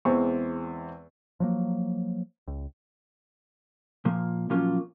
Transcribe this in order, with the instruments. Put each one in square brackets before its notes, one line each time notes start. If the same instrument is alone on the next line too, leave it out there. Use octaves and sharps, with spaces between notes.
[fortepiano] E2 E3 G#3 C4 C#6
[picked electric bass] F3 F#3 A#3
C#2
[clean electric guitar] A#2 F3 A#3
A#2 F3 F#3 A#3 C#4 F4